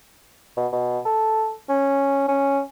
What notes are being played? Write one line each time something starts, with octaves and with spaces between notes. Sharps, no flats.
B2
B2
A4
C#4
C#4